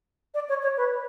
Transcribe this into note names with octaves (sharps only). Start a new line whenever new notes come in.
D5
C#5
C#5
B4